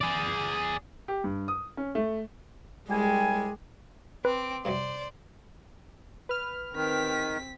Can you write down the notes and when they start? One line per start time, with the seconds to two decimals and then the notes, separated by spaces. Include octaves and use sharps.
0.01 G#4 D5
1.08 G4
1.24 G2
1.48 D#6
1.77 C#4
1.95 A3
2.89 C2 G3 G#3 G4 G#5
4.25 C4 B4 D6
4.65 G2 C3 F#3 C5 D5
6.29 B4 F6
6.73 D#3 C4 B6